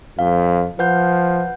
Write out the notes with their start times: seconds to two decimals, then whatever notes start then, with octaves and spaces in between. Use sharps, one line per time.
0.19 F2 F5
0.79 F3 B4 F#5 G6